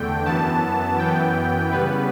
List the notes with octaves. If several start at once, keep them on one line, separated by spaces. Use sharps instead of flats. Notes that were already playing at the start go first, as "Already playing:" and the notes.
Already playing: E2 D3 A3 G5
F#2 E3 B3 A5
F#2 E3 B3 G5
C#3 G3 B3 B4